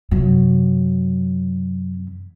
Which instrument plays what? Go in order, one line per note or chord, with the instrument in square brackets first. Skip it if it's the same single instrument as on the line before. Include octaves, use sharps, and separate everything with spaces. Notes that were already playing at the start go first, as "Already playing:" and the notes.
[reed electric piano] F#2 [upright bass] C3 F#3